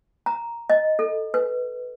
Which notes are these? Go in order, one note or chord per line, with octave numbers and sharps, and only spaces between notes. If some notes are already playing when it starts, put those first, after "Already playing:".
A#5
D#5
A4
B4